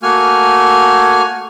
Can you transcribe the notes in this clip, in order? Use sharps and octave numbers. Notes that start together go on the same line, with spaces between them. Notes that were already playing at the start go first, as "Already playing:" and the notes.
A3 A#3 F#4 G#5 F6